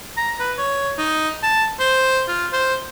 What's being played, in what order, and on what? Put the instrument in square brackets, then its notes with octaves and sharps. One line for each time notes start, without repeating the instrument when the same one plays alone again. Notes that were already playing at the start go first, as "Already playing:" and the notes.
[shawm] A#5
B4
C#5
D#4
A5
C5
F4
C5